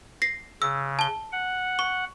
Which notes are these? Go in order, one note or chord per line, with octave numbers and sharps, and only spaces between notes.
A#6 C7
C#3 E6
A5 G7
F#5
C#6